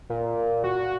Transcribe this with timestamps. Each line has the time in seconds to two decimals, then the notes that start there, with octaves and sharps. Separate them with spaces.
0.10 A#2
0.64 F#4